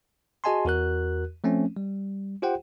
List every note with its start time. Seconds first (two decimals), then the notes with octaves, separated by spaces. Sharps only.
0.44 F#4 G#4 D#5 G#5 A5 C6
0.65 E2 F#4 A#4 F#6
1.44 F3 A3 C4 C#4
1.77 G3
2.42 F4 G4 C5 F#5 G5